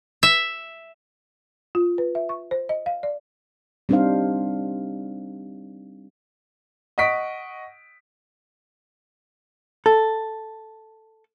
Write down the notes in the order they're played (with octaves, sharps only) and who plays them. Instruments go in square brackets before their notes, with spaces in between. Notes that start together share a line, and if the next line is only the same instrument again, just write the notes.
[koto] E5
[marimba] F4
B4
E5
C#6
C5
D#5
F5
D5
[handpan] G3 C4 D4 D#4 C5 F5
[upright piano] D#5 F#5 C#6 B6 D7
[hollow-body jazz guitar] A4